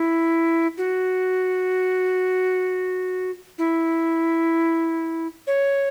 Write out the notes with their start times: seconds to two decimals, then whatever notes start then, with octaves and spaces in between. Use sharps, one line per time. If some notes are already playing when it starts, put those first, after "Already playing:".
Already playing: E4
0.78 F#4
3.58 E4
5.47 C#5